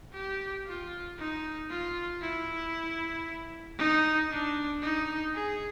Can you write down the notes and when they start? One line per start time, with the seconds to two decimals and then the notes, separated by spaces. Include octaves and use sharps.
0.13 G4
0.66 F4
1.18 D#4
1.69 F4
2.21 E4
3.79 D#4
4.30 D4
4.82 D#4
5.35 G#4